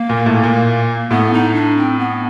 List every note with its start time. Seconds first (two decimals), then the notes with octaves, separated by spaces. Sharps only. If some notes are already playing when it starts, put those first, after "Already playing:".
Already playing: A#3
0.09 A#2
0.26 A2
0.44 A#2
1.10 A2 B3
1.33 D#4
1.54 D4
1.77 C4
1.99 B3